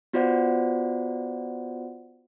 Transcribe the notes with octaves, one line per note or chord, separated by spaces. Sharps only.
B3 F4 F#4 C5 D5 F#5